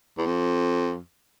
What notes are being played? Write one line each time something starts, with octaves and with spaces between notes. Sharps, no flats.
E2
F2